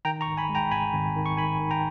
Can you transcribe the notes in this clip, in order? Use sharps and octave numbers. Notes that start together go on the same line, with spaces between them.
D#3 G5 A#5
A#5 C#6
G#1
G#5 B5
G#3
G5 A#5
G#1 G#5 B5
G#1
D#3
C#6
D#3 G#5 B5
D#3
G5 A#5